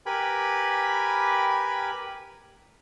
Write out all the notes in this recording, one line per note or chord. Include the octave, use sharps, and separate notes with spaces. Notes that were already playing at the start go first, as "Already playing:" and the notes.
G4 A#4 B4 G#5 B5